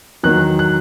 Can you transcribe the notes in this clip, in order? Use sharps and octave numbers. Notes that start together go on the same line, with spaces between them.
E2 D#3 F#3 F#6
F#6